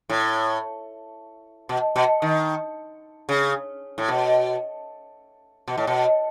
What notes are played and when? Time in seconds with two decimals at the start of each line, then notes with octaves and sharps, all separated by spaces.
0.09 A2
1.69 B2
1.96 B2
2.22 D#3
3.29 C#3
3.98 A2
4.08 B2
5.68 B2
5.78 A2
5.87 B2